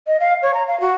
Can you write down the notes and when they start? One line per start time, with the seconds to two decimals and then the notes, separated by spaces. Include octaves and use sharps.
0.06 D#5
0.19 F5
0.42 C#5
0.53 A#5
0.67 F5
0.80 F#4